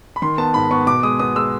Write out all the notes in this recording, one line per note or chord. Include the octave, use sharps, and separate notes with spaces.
B5
D#3 C6
B3 A5
G#2 B5
B3 C#6
B2 D6
G#3 D#6
B3 D#6
G#3 E6